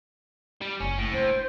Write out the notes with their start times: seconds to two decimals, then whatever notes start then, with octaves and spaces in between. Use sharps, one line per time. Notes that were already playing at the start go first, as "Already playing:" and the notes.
0.61 G3
0.80 F#1 C#4
0.98 A2
1.13 D4 C5